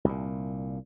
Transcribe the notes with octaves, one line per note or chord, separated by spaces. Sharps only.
C2 A#2